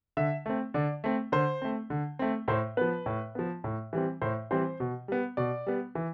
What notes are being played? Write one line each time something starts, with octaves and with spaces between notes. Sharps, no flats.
D3 E5
A3 C4
D3 D5
A3 C4
D3 C5
A3 C4
D3
A3 C4
A2 C5
F3 B3 B4
A2
F3 B3
A2
E3 G3 C4
A2 C5
E3 G3 C4 C5
B2
G3 B3
B2 D5
G3 B3
E3